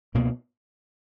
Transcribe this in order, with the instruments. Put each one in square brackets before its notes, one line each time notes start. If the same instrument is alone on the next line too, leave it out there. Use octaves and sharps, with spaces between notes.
[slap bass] C#2 B2 A#3